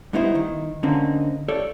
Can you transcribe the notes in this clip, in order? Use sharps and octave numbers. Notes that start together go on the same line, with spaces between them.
G2 B3 D#4 E4 C5
D#3
D3 A#3 C4 C#4 D#4
A4 C#5 D5